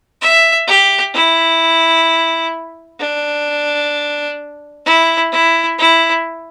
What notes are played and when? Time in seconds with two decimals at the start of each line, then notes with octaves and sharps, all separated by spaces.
0.22 E5
0.68 G4
1.15 E4
2.99 D4
4.86 E4
5.32 E4
5.78 E4